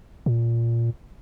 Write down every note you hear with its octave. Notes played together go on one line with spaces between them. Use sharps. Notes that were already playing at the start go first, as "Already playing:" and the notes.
A#2